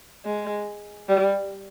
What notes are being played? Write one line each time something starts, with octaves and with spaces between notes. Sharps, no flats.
G#3
G3